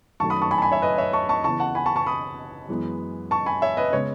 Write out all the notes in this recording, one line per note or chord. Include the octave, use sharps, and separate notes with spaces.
F#2 D#3 F#3 A3 A5 C#6
B5 D#6
A5 C#6
G#5 B5
A5
G#5 B5
C#5 E5
B4 D#5
C#5 E5
A5 C#6
A5 C#6
C#3 E3 B3 A5 C#6
F#5 A5
G#5 B5
A5 C#6
A5 C#6
B5 D#6
F#2 E3 G#3 B3
A5 C#6
G#5 B5
C#5 E5
B4 D#5
C#3 G#3 B3 C#5